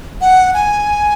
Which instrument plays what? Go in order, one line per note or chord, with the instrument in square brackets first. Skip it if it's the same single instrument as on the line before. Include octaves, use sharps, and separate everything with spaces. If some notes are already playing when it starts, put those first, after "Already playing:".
[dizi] F#5
G#5